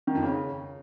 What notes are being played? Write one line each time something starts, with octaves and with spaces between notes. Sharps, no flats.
D#3
F2
C#3